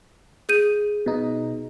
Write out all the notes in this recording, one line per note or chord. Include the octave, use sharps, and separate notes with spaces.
G#4 G6 D#7
B2 D#4